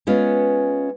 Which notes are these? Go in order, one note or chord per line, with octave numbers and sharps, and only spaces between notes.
G#3 B3 C#4 F4 F5